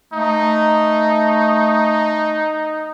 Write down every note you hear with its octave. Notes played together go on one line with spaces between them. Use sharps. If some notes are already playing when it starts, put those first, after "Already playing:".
A3 D#4